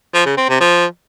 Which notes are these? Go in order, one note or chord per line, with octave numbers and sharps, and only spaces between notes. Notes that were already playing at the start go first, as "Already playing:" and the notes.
F3
C#3
C4
C3
F3